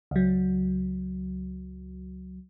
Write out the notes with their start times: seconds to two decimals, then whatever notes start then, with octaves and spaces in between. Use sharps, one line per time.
0.11 C#2 F#3